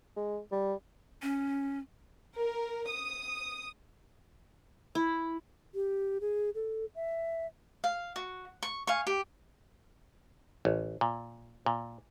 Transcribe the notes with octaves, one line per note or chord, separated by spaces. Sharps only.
G#3
G3
C#4
A#4
D#6
E4
G4
G#4
A4
E5
F5
F#4
C#6
F5 G#5 C#6
G4
A1
A#2
A#2